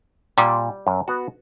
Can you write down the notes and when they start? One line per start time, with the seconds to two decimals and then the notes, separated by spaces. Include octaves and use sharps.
0.38 A#2 G3
0.87 F#2
1.08 B3 F#4